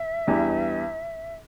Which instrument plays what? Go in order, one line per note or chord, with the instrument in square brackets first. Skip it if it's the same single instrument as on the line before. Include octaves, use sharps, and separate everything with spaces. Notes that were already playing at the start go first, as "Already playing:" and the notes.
Already playing: [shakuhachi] E5
[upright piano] E2 E3 G3 D4